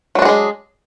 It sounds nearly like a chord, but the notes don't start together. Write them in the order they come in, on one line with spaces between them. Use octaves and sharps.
F#3 D4 F#4 G#4 G#3